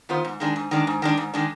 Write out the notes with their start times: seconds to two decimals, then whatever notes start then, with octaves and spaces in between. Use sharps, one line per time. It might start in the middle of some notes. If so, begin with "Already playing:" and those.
0.09 D#3 B3 F4 C5
0.25 G#2
0.40 D#3 G#3 D4
0.56 G#2
0.71 D#3 G#3 D4
0.87 G#2
1.02 D#3 G#3 D4
1.17 G#2
1.34 D#3 G#3 D4